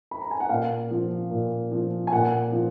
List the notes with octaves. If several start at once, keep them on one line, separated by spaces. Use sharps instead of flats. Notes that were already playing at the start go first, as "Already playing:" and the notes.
B5
A#5
G#5
F#5
A#2 F5
F3
A#2
F3
G#5
A#2 F#5
F3